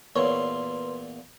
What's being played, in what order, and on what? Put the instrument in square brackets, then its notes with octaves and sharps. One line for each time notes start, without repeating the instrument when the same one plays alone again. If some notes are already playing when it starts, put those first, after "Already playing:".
[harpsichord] E2 A#2 [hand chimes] A#4 B4 C6 [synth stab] C#5